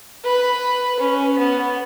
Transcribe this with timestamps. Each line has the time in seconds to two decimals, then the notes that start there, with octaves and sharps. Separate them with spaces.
0.24 B4
1.00 C#4
1.38 B3